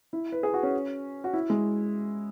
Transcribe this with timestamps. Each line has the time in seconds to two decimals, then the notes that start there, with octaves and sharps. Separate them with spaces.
0.13 E4
0.32 B4
0.43 G#4
0.54 F#4
0.63 C#4
1.24 F#4
1.33 E4
1.50 G#3